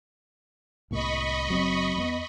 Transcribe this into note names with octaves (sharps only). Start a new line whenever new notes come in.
C2 A2 A#3 D#5 B5 C#6
F#1 F#3 C4
E2 A#3 B3